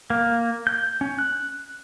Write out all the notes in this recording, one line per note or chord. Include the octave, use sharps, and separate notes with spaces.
A#3
G6
C#4
F#6